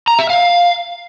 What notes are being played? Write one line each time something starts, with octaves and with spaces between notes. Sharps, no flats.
A#5
E5
F5